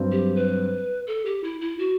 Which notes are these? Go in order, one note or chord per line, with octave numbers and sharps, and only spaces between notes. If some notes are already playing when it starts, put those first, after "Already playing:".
Already playing: G2 F#3 C4
G4
B4
A4
G4
E4
E4
F#4